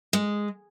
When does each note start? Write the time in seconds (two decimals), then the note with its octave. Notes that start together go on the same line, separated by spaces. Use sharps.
0.13 G#3